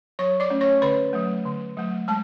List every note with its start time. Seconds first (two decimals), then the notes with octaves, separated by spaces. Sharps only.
0.19 F#3 C#5 C#6
0.40 D5 D6
0.50 A3 C#4
0.61 C#5 C#6
0.82 D3 B4 B5
1.13 F#3 A3
1.45 D3
1.77 F#3 A3
2.08 G#3 A5